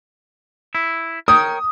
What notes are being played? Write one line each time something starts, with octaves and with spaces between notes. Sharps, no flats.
E4
A#4 C#5 G5 D#6